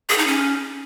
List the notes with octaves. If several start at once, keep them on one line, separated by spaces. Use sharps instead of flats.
G#4
D#4
C#4